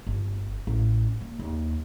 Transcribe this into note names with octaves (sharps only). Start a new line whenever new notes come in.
G1
A1
A#3
D#2